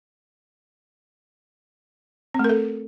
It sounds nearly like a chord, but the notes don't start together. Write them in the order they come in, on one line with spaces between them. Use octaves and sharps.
C4 A3 A#4 A4